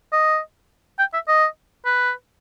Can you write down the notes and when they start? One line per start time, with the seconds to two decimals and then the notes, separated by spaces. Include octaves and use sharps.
0.13 D#5
0.99 G5
1.14 E5
1.28 D#5
1.85 B4